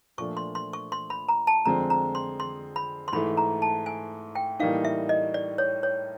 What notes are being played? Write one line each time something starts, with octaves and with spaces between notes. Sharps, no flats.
A#2 F3 A3 D4 C#6
C6
C6
C#6
C6
B5
A#5
A5
F2 D3 F3 G#3 C4 A#5
A#5
C6
C6
B5
C6
G#2 E3 A3 B5
A#5
A5
G#5
G5
A2 E3 G3 A#3 D#4 F5
E5
D#5
D5
C#5
C#5